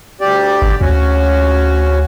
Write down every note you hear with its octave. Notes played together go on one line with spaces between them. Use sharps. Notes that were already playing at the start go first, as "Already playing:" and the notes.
D2 G4 D5
G#1
D2 C#4 F#4